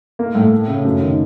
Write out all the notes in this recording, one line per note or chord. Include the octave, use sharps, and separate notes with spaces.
A#3
A2
A3
C#3
F#2
D#3